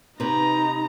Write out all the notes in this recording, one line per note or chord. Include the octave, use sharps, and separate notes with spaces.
C3 D#4 B4 A#5